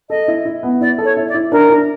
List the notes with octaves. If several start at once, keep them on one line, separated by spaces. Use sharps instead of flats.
A4 D#5
E4
E4
B3
E4 D5
A4
C#5
E4
D5
E4
D4 A#4
D4